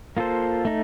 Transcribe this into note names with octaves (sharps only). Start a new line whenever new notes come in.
A#3 F4 A4 C5
A3 D#4